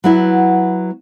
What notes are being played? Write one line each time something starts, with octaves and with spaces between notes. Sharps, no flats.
F#3 B3 E4